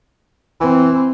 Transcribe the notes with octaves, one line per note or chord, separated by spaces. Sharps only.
E3 C4